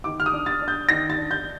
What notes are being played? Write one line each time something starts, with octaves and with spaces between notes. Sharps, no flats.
D#3 D6
F6
D#6
D4
A6
D4
G6
D#3 A#6
A6
D4
G6